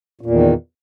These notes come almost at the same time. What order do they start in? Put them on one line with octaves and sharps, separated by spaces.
A#2 E2 D#3